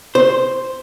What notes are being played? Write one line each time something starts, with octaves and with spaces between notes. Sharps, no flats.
C5